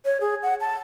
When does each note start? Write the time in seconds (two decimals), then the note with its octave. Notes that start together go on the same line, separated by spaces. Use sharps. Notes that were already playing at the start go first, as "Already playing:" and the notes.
0.05 C#5
0.21 G#4
0.43 F#5
0.61 A5